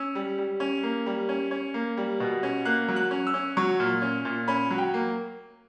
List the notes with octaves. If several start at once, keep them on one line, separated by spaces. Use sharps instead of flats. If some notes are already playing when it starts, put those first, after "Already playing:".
Already playing: C#4 E6
G3
G3
C#4
A#3
G3
C#4
C#4
A#3
G3
B2
C#4
A#3 F#6
F#3
F#6
C#4
E6
C#4
F#3 C#6
A#2
C#4
A#2
C#4 B5
F#3
G5
A#3